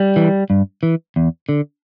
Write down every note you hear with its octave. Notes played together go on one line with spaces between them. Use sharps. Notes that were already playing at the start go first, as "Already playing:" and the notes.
Already playing: G3
E3
G2
E3
E2
D3